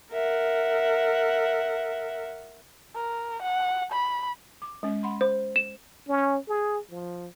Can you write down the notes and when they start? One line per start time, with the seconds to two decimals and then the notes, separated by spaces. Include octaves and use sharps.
0.12 A#4 E5 F#5
2.95 A#4
3.42 F#5
3.92 B5
4.62 D6
4.83 G#3 C#4
5.03 F#5 B5 C6
5.21 C5
5.56 E7
6.08 C#4
6.48 G#4
6.91 F3